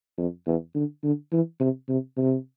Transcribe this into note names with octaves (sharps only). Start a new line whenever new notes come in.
F2
E2
D3
D3
E3
C3
C3
C3